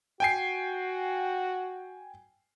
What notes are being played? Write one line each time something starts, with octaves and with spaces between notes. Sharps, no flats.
F#4 G5 G#5 C7